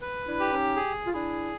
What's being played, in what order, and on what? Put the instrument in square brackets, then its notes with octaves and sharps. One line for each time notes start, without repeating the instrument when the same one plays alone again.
[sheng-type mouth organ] B4
[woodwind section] D4 E4
[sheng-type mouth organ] G4
[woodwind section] C#4 D#4
[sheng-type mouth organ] G#4
[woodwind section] F4
[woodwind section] D4 E4 [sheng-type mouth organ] G#4